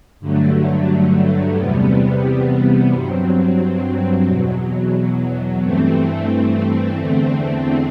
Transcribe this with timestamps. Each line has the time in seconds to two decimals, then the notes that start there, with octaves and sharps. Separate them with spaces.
0.20 G2 D3 F#3 A3
1.55 E2 C3 G3 B3
2.91 G2 F#3 C4
4.27 E2 B2 F#3
5.62 G2 E3 A3 C4
6.97 E2 D3 A3 C4